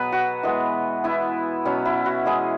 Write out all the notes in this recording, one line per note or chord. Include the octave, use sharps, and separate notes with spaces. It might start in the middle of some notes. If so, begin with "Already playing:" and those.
Already playing: B2 F#3 B3 G#4 B4
F#4
E3 G#3 B3
E3 B3 E4
B2 F#3 B3 C#4
E4
F#4
E3 G#3 B3 G#4